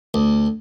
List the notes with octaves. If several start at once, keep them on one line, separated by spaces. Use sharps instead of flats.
D2